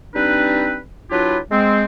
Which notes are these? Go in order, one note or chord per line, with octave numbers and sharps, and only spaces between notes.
G3 C4 D4 D#4 B4
F#3 D4 E4 F4 G4 B4
G#3 C4